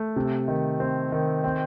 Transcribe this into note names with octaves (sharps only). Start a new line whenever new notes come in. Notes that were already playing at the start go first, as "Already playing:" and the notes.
Already playing: A3
C3
D#3
C4
D#3
C4